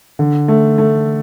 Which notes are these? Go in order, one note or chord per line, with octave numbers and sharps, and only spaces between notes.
D3
A3
A3